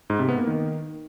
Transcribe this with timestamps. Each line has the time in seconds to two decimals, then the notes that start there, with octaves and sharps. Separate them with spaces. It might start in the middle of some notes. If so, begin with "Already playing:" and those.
0.10 G#2
0.19 C3
0.29 B3
0.38 A#3
0.47 D#3